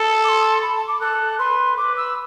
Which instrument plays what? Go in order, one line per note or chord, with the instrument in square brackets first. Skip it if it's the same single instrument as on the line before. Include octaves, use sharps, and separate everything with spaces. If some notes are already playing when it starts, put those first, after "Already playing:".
Already playing: [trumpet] A4
[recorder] D6
C6
B5
A5
D6
[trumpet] A4 [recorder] F#6
[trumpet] B4 [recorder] C6
[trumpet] B4 [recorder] D6
[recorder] E6